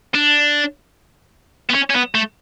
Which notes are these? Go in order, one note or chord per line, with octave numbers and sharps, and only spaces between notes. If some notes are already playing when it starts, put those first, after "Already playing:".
D4
B3
C#4
C#4
B3
A3